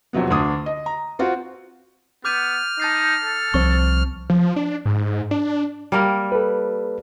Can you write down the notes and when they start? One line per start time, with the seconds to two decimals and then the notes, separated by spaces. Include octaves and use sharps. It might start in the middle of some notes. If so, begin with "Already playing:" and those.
0.13 F2 C3 F#3 B3
0.30 D2 D4 D#6
0.66 D#5
0.86 A#5
1.19 C4 F4 F#4
2.25 B3 D6 F6 G6 D#7
2.80 D#4 A5 A6 C7
3.24 A4
3.54 C2 F3 C4 C#6
4.30 F3
4.56 D4
4.86 G#2
5.31 D4
5.92 G3 A#3 A#4
6.32 A4 B4